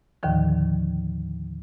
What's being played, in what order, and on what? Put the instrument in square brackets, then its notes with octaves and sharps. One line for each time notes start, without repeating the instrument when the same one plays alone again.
[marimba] D#2 A2 D3 D#3 F3